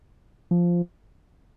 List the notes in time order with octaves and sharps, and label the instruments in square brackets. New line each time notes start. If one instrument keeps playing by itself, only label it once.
[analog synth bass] F3